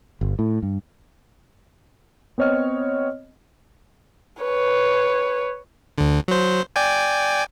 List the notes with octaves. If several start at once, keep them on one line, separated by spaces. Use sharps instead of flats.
G1
A2
G2
B3 C4 C#5 D#5 F6
B4 C#5
D2 D3
F#3 C5
D5 G5 G#5